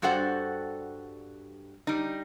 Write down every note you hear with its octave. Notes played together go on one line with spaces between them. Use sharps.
G2 G3 F#4 A4 C5 F#5
G3 D#4